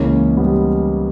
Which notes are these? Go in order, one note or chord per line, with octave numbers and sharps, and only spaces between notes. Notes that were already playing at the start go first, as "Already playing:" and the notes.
Already playing: C#2 C#3 E3 A#3 C#4
G3 B3